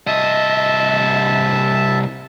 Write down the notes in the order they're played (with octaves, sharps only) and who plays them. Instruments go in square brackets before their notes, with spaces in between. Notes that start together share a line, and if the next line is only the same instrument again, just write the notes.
[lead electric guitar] C2 D#5 [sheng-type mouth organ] E5 A5